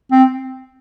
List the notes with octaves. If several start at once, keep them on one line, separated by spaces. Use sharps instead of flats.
C4